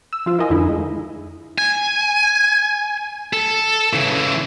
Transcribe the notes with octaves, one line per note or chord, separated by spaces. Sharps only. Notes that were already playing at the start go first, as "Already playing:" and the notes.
E6
F3 F4 F5
E4 F4 A#4 D#5 G#5
F2 D3 D#4 E4
G#3
G#5
A4
C#3 E3